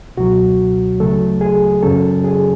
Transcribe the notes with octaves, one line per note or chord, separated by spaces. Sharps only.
C#2 B2 F#3 F#4
D2 C#3 F#3 A3 A4
G#4
F#2 C#3 F#3 C#4 A4
G#4